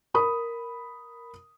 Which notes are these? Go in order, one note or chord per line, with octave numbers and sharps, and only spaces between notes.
A#4 B5 D#6